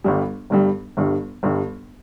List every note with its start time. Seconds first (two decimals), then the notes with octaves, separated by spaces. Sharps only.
0.04 G1 G2 G3
0.50 G1 G2 G3
0.97 G1 G2 G3
1.43 G1 G2 G3